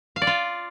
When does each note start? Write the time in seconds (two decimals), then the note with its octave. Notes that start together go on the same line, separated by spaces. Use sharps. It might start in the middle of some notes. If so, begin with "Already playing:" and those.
0.16 F5
0.22 D5
0.27 F4